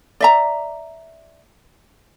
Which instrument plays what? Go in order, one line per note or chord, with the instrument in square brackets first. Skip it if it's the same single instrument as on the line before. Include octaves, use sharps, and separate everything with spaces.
[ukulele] D5 E5 A#5